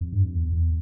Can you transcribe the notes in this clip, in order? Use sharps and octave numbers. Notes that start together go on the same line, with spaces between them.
F2
G2
F2
E2
E2